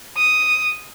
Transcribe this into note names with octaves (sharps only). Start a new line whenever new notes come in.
D#6